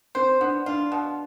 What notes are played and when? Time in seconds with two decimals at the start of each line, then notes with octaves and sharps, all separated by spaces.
0.15 C4 C5
0.40 B3 D4
0.66 D4 F4
0.92 B2